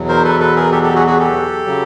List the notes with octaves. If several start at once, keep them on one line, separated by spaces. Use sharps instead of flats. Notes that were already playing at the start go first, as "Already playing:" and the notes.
Already playing: E2 B2 F#3
A#4 C5
A4 B4
A4 B4
G#4 A#4
G4 A4
G4 A4
F#4 G#4
F#4 G#4
G4 A4
C#3 F#3